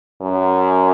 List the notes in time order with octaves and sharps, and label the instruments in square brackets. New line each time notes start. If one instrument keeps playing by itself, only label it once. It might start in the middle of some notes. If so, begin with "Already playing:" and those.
[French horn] F#2